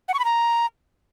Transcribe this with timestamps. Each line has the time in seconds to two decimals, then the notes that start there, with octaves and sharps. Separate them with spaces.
0.08 F#5
0.14 C#6
0.19 B5
0.25 A#5